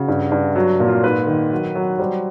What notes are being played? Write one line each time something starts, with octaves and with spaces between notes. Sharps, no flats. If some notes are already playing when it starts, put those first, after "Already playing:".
Already playing: C#3 F#4
G2
G2
F#3 F#4
A#2
F4
G#2 B4
D#3
F#3
F#3
G3 C5